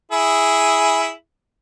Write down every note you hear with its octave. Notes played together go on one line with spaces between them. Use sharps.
E4 G#4